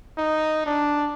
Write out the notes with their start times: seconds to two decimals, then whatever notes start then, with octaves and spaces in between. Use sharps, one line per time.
0.18 D#4
0.66 D4